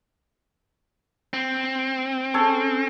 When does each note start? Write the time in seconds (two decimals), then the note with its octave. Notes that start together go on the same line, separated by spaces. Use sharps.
1.33 C4
2.34 C#4 A4 C#5